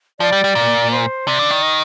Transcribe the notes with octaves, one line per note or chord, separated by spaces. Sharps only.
F3 D5
G3
G3
A#2
C5
C3 D5
D3
D#3
D#5